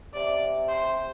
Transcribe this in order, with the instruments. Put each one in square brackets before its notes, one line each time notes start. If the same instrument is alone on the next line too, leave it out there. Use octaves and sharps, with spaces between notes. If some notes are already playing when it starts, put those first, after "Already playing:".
[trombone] C3 [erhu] D5
[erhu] C5